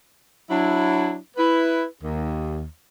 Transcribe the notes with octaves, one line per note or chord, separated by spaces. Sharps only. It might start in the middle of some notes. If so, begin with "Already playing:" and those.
F#3 D4 E4
E4 B4
D#2